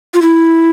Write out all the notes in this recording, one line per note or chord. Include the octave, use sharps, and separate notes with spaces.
F4
E4